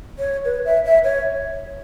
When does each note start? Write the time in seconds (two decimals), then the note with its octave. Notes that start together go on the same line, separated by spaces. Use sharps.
0.19 C#5
0.45 B4
0.65 E5
0.85 E5
1.04 C#5